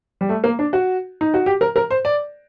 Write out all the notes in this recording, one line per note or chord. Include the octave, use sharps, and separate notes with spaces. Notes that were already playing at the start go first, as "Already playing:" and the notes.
G3
A3
A#3
D4
F#4
D#4
F#4
G4
A#4
A#4
C5
D5